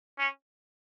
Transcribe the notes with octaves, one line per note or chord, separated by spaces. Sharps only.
C#4